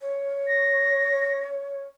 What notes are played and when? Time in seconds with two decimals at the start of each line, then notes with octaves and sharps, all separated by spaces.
0.01 C#5
0.47 A#6